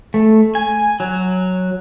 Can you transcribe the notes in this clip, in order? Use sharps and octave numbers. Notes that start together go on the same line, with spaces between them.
A3
G#5
F#3